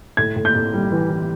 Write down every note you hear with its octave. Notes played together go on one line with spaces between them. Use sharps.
A2 G#6
A2
G6
A2
G3
E3
E3